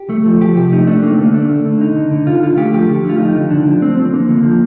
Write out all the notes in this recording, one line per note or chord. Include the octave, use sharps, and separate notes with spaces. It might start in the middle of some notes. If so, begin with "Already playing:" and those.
Already playing: G4
A3
F3
F3 G4
C3 G4
A3 D#4
A3 D4
A3 A#3
C4
D3 A#3
A3 D4
A3
D3
D3 D#4
D3
D3
D3 F4
D3 F4
A3 G4
F3 G4
D3
A3 F4
F3 D#4
D3
D3 D4
F3 D4
A3 C4
F3 C4
D3 A#3
D3
F3